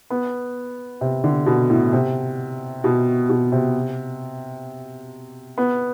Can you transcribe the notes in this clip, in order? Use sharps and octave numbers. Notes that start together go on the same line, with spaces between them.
B3
C3
D3
B2
A2
C3
B2
B2
C3
B3